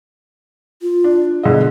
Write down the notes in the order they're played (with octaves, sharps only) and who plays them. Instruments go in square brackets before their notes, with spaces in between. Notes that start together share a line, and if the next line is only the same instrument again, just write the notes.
[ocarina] F4
[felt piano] D4
[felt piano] B2 D3 D#5 [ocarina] G#4